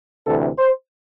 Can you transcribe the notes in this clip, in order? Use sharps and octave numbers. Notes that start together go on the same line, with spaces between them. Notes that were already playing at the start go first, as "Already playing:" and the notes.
D2 C3 E3 A4
C5